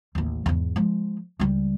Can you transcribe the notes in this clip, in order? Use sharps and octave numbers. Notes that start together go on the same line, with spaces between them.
A1 D#2
E2 G#2
F3 G#3
C#2 G3